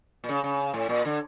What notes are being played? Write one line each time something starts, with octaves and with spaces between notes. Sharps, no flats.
A#2
C#3
C#3
A2
A#2
D3